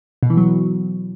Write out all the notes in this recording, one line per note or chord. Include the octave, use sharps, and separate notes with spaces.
B2
E3
F#3